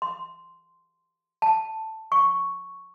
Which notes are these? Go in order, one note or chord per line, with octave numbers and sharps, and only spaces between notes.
C6
A5
C#6